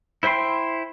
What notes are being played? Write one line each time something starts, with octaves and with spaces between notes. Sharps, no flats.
E4 C5 E5 G5 C6